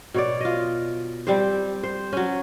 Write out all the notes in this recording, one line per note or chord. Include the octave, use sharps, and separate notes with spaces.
B2 C#5 D5
F4 D#5
G3 C4 G4 C5
C5
F#3 C#4